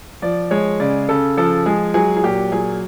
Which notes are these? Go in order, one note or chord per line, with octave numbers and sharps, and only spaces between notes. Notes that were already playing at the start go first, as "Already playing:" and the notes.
F3 D5
G#3 C#5
C#3 D5
C#3 A4
F3 A4
G#3 G#4
F#3 G#4
G#4
A#2 G4
F#3 G#4